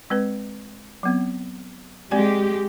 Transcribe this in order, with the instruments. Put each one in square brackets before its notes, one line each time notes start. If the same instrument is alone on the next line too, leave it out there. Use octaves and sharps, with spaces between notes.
[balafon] G#3 C4 B4
F#3 B3 C4
[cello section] G#3 G4 [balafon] C4 D5 G#5